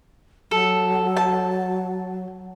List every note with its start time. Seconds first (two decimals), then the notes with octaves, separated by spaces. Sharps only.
0.51 F#3 A4
1.17 A5